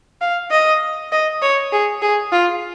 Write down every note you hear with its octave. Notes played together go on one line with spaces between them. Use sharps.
F5
D#5
D#5
C#5
G#4
G#4
F4